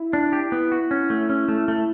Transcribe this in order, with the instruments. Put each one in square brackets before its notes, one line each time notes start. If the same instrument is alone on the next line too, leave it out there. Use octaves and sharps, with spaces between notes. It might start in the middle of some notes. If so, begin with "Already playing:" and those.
Already playing: [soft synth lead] E4
[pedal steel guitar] D4
G4
B3
F#4
C#4
A3
C#4
A3
A3